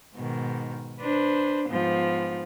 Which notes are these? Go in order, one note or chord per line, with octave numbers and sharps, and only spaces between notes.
G#2 B2 D#3
D4 B4 C5
G#2 F3 B3